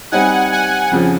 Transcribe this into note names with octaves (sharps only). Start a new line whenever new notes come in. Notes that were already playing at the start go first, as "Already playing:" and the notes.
G3 C4 D#4 F#5 G#5
F#5 G#5
F2 C#3 F3